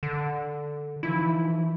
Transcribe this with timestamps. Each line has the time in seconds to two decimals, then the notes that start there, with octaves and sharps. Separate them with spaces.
0.03 D3
1.03 E3 F3 D#4 E4